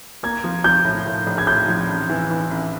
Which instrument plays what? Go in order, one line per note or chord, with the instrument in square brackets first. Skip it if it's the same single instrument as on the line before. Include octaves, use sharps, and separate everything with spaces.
[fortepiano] A#3 [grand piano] G#6
[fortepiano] F3
[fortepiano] F3 [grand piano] G6
[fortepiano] A2
A2
A#1
[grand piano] G#6
[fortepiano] A2 [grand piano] G6
[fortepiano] F3
A1
E3
E3
A1